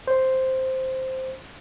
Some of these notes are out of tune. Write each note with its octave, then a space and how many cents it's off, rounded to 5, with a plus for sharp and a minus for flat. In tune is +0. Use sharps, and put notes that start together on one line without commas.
C5 +0